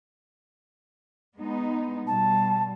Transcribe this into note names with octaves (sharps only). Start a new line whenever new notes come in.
G#3 B3 D#4
B2 G3 A5